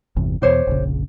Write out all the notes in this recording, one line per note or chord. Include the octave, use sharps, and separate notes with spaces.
G1 E2 C3
E2 B2 G4 C5 C#5
F1 A#1 C#3